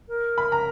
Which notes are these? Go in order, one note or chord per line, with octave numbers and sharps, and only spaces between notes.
A#4
B5
A#5